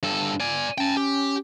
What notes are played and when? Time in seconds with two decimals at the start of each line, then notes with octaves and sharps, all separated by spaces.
0.03 G2 A4
0.40 D5 G#5
0.78 C#4 G5 A5
0.97 G4